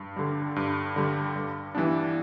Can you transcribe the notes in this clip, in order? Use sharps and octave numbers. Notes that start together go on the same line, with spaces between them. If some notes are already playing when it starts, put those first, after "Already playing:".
Already playing: G2
D3 G3
G2
D3 G3
G2
E3 G3 B3 D4